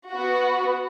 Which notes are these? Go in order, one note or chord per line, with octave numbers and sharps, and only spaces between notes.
B3 F#4